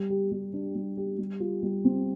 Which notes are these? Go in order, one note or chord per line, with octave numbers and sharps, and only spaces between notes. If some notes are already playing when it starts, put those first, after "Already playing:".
Already playing: G3
G4
G3
D4
G3
G4
G3
F4
G3
C4